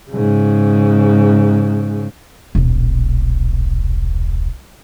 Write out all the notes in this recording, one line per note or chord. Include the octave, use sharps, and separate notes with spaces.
G#2 C#3
D#1 B1